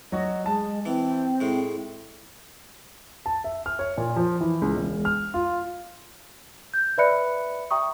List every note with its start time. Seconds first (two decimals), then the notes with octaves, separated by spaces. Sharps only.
0.12 F#3 F#4 D#5
0.46 G#3 A5
0.86 E3 C4
1.41 A2 G#3
3.26 A5
3.44 E5
3.66 F6
3.79 C#5
3.98 A#2
4.16 F3
4.41 E3
4.62 C#2
4.77 E1
5.05 F6
5.34 F4
6.74 G6
6.98 B4 D5 E5 B5 F#6 C#7
7.71 E5 G5 A#5 C#6 D#6